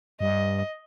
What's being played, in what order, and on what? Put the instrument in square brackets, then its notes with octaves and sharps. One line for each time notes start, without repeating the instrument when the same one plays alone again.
[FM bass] G2 [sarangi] D#5